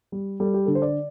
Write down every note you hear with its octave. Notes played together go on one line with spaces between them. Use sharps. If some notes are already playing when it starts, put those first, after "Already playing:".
G3
G3 A4
G4
D3 A4
C5
D5